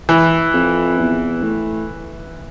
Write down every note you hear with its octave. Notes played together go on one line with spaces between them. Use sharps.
E3
F2
E2
A2